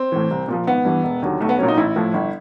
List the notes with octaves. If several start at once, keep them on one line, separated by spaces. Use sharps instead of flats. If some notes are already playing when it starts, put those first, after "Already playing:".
Already playing: C4
A2 E3
C2
A#2 F3
G#1 B3
G2 E3
E1
D#2 D3 F#3
B1 A3
B3
A#2 F#3 C#4
D#4
A1 E4
A2 F3
G1